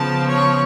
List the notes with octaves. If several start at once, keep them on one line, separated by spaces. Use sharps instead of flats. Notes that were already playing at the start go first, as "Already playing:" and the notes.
Already playing: C#3 F3 B3 A5
C#5